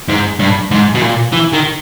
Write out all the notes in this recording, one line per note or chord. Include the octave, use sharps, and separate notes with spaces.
G#2
G2
G#2
B2
A#2
E3
D#3